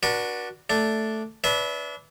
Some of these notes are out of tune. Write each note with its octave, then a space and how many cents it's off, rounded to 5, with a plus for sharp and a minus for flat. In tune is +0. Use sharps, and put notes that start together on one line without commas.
D4 +5 F#4 +0 B4 -45
A3 +0 D4 +0
D4 -30 B4 +0 E5 -25